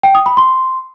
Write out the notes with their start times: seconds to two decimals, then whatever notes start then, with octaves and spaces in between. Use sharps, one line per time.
0.03 G5
0.15 D#6
0.26 B5
0.37 C6